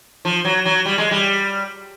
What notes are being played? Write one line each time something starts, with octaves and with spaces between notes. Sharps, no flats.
F3
F#3
F#3
G3
G#3
G3